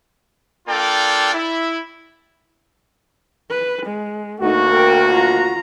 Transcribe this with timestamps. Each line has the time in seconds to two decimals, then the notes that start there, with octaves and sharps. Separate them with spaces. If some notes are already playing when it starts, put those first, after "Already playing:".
0.68 A#3 D4 F4 A4 D5 G5
1.34 E4
3.50 B4
3.86 G#3
4.41 D2 A3 A#3 D#4 F#4
4.71 A#4 G5
5.13 F4 A#5